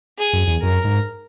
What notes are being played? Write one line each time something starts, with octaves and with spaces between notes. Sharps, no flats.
G#4
F#2
E2
F#2 A#4
G#2